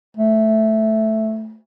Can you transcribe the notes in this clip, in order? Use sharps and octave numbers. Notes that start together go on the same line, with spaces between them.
A3